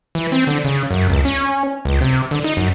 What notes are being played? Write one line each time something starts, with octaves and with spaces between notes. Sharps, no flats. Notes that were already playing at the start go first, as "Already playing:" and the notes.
E3
C4
D3
C#3
F#2
C#2
C#4
C#2
C3
D3
D#4
F#2